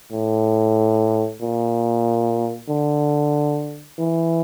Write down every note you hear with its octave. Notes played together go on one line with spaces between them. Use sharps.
A2
A#2
D3
E3